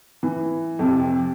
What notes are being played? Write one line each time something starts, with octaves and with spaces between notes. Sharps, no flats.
E3
F2 C3